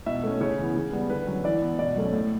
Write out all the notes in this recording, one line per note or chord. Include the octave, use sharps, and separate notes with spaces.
B2 E5
A3 C#4
C#3 C#5
E3 B3
C#3
G3 B3
D3 B4
F#3 C#4
E3 D5
B3
B2 D5
F#3 A3 C#4
A2